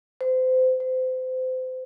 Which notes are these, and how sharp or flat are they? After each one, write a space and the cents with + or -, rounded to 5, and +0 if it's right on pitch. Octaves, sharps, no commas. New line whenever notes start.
C5 -30
C5 -30